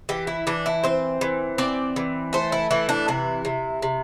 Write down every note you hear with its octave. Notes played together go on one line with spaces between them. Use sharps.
E3 G4
E4
E3 D4
E4
C4 C5
E3
C4 D5
E3
A3 C5
E4
E3 E4
D4
C3 E4
C3
C3